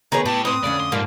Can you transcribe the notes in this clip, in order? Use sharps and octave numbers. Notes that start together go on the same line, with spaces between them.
D#3 B3 G#4 B4 C#5 A#5
A2 G4 A5
C4 B4 C5 D#6
F2 D3 C#4 D5
C6
G#2 F3 G3 A#3